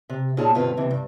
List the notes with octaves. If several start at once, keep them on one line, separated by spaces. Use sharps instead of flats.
C3
A#2 D#4 F4 G#4 C#5 A5
G2 B2 D3 C4 F4 B4
D#2 C3 E3
G2